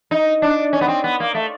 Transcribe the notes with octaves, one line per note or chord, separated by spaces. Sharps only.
D#4
D4
C#4
B3
C4
B3
A#3
A3